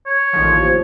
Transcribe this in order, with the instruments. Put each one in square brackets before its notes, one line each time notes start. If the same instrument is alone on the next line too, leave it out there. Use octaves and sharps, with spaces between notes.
[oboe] C#5
[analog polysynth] A1 D#2 F3